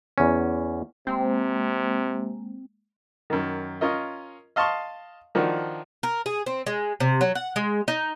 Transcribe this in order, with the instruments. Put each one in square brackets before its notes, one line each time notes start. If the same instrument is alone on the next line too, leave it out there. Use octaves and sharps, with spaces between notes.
[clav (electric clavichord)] E2 C#4
[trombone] C3 [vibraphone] G#3 A#3 [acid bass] C4
[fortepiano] F#2 D#3
C#4 F4 A#4 D#5
D#5 F5 A5 C6 C#6
D#3 F3 D4 F#4
[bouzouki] A#4
G#4
C4
G#3
C3
F#3
F#5
G#3
D#4